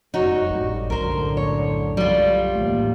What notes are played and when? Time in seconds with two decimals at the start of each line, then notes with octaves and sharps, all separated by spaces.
0.14 F1 F#2 D#4 F#4 C#5
0.50 G#1 F#2 A2 G3
0.90 B1 F#2 A2 D3 A#4 C5
1.37 C#5
1.97 G3 F4
2.55 A1 D#2 A2 A3